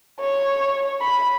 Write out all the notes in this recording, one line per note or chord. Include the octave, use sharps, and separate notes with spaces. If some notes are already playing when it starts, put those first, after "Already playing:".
C#5
B5